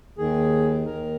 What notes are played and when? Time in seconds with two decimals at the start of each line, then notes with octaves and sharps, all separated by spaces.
0.17 D#2 D#3 G#4
0.86 D#2 D#3 A#4